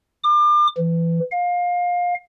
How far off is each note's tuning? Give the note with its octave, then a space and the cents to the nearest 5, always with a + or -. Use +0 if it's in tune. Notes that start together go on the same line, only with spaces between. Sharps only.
D6 +35
E3 +20
F5 +25